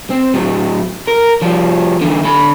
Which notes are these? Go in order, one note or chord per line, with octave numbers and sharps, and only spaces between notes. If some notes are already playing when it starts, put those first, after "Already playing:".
C4
A2 F#3
A#4
F3 G3
D3 E3
D3 B5